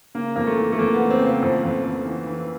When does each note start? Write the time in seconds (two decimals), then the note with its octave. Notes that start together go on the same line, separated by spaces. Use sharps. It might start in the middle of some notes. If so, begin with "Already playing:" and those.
0.15 C#3 A#3
0.36 F2 A#3
0.47 A3
0.57 E3
0.72 A3
0.79 F2 A#3
0.94 B3
0.99 E3
1.10 C4
1.21 C#3
1.26 C4
1.42 F2
1.63 F2
1.84 F2
2.06 E3
2.27 E3